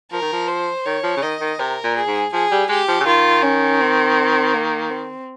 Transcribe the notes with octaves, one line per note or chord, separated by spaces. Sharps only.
F3 A#4
D#3
F3
C5
D#3 C#5
F3
C#3
D#3 D#5
D#3
C3 A#4
A#2
G#4
G#2
F3 G#4
G3
G#3 G4
F3
C#3
D#3 F4
C#4
C4
A#3
C4